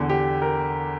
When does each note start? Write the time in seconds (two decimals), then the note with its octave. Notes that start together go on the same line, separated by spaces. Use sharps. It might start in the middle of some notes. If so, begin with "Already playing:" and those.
Already playing: E2 D3
0.09 G4
0.42 A#4